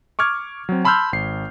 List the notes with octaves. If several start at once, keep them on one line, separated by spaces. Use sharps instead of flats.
C#6 D6 F6 G#6
F#3 C4
A5 B5 C6 E6 F6 G6
G#1 C7